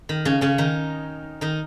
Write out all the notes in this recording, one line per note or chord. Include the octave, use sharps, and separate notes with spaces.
D#3
C#3 C#4
C#3 C#4
D#3 D#4
D#3 D#4